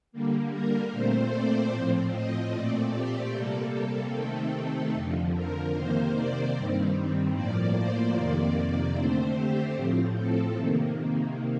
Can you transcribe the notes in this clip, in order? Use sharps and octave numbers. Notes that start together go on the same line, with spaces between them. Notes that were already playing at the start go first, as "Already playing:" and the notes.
D3 G3 A#3
A#4
A#2 A3 C4 C5
D5
A2 F3 C4
D#5
A#2 A3 C4 D5
G4
C3 G3 A#3 A4
C3 D#3 A3 C4 A4
F2 D3 F3
A#4
C3 D#3 A#3 C5
D5
G2 D#3 G3 C4
A2 F3 A#3 D5
C5
F2 C3 D#3 A#3 D5
D3 A3 C4 C5
G4
A2 F3 C4
A4
C3 D#3 A#3